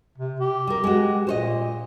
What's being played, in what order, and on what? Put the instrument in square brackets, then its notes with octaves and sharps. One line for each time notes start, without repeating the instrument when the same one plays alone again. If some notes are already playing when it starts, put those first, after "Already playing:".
[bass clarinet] C3
G4
[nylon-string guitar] G3 A#4
G#3 F#4
[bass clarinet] A#2 [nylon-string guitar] C5 C#5 D#5